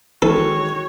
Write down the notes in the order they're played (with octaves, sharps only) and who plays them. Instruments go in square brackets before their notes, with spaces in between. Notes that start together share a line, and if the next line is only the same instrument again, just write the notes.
[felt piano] D#3 G#3 [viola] F#4 C#5 [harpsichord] A4